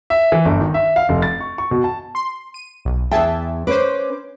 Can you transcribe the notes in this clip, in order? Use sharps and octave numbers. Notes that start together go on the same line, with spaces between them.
E5
E3
G1
D#3
E5
F5
F1
A6
C#6
C#6
B2
A5
C6
D#7
B1
E2 G#4 E5 G5 A5
C#4 B4 C5 D6